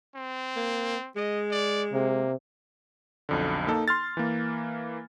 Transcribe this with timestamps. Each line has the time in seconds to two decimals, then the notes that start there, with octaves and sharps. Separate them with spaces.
0.15 C4
0.56 A#3
1.16 G#3 D#5
1.51 D5
1.93 C3 A#3
3.29 B1 F2 D3
3.67 A#3 D#4 A4
3.88 C6 F6 A6
4.17 E3 A#3